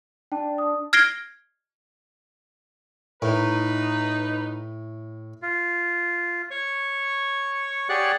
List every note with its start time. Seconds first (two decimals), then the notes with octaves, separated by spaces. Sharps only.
0.32 D4 G5 A5
0.58 D#6
0.93 F6 G#6 A#6 C7 D7 G7
3.22 A2 D#4 B4
5.42 F4
6.51 C#5 C#6
7.89 G4 G#4 C#5 D5 F#5 F#6